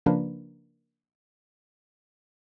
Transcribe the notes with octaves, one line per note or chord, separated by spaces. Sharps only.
C#3 F3 A#3 D4 A#4 B4